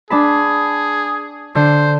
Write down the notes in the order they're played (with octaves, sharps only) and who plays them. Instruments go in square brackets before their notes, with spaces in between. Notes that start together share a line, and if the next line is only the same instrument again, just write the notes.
[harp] D4 A5 B5 [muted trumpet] G#4
[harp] D3 [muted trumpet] C5